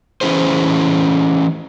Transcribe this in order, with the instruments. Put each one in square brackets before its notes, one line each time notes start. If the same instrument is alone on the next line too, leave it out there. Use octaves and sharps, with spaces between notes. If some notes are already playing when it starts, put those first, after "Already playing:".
[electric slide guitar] E3 C#4 E4 G#4 C5